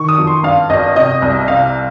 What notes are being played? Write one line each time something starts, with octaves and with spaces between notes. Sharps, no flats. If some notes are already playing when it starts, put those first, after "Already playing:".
Already playing: D#3 C#6
D#6
F2
C6
G2 F5
G#1 D#5
C3 D#5
C2
C3 F5